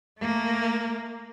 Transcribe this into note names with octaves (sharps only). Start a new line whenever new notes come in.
A3 A#3